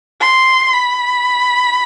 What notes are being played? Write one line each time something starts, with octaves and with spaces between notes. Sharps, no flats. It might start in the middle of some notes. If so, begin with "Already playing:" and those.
C6
B5